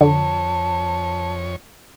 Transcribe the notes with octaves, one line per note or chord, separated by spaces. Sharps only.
F2 D3 C#5 A5